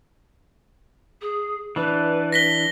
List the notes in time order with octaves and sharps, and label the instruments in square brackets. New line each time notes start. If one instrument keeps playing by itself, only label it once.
[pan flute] G#4
[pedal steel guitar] E3 D4 [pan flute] B4
[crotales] A#6 B6 G7